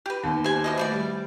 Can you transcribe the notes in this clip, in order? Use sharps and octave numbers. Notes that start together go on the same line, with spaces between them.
G4 B4 G5
D#2 B3
G4 G#4 C5 G#5
D#3 E3 F#4 C5 D#5 E5
D#3 E3 A3 G#4 D5
G3